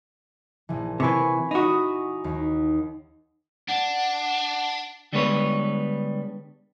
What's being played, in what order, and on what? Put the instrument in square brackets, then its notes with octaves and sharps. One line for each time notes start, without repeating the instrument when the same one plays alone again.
[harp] A#1 E3
[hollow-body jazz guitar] C3 E3 [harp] G#5 B5 C#6
[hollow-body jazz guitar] D#4 F#4 [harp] B5 D#6
[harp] D#2
[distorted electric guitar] D4 [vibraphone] F#5
[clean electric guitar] D3 G3 G#3 B3 B4 C#5